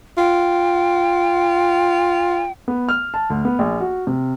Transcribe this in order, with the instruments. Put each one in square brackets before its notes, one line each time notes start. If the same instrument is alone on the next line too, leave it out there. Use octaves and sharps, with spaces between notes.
[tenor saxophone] F4 [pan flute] G5
[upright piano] B3
F6
A5
D2
B3
A#1
F#4
C3